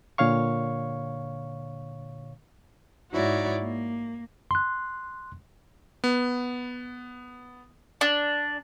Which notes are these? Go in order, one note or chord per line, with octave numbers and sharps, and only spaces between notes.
A#2 D3 C#5 F5 C#6
G#2 D#4 E4 F#4 C#5 D5
A#3
C6 F#6
B3
D4